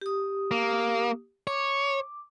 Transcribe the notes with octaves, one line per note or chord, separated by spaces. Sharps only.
G4 D#6
A#3
C#5 D6